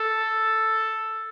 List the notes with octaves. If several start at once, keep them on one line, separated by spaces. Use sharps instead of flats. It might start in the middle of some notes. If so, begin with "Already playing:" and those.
Already playing: A4